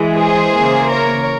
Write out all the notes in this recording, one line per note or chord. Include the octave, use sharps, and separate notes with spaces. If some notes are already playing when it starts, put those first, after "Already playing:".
Already playing: E3 G#3
G#4 C5
C#3 E3 A#3
A#4 C#5